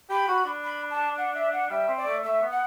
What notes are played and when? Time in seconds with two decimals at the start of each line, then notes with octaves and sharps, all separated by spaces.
0.10 G4 B5
0.28 F#4
0.46 D4
0.64 B5
0.91 A5
1.18 F#5
1.35 E5
1.53 F#5
1.70 G3 E5
1.88 C4
1.98 D5
2.06 A3
2.24 A3 E5
2.42 B3
2.51 F#5